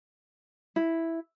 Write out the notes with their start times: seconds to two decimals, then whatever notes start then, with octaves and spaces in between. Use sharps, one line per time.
0.76 E4